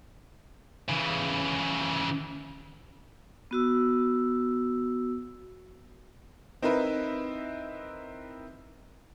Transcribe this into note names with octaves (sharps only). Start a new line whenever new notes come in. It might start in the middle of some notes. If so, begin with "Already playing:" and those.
C#3 E3
B3 F#4 E6
C4 D#4 E4 A#4 B4